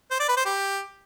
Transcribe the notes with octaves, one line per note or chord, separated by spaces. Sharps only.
C5
D5
B4
C5
G4